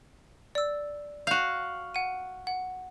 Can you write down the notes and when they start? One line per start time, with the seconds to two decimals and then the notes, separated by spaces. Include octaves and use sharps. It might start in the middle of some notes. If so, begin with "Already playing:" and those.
0.55 D5 E6
1.27 F#4 F5 G6
1.95 F#5 D#7
2.47 F#5